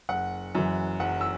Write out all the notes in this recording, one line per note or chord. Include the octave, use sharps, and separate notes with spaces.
F#1 F#5
F#2 E3
F#1 F#5
E6